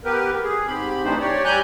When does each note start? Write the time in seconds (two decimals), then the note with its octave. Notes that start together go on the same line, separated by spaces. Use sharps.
0.05 B3 G4 A#4 B4
0.43 G#4
0.67 G#2 C4 G4 B5
1.03 E3 A3 D4 D#4 C5
1.20 G4 C#5 D5
1.45 G3 G4 G#5 A#5 F#6 G6